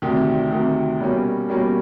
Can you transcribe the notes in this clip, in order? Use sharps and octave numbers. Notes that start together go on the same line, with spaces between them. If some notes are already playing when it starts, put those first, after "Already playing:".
D2 C3 D#3
D2 C3 D#3
B2 G3 A#3 C#4
B2 G3 A#3 C#4